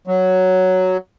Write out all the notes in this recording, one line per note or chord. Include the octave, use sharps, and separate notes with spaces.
F#3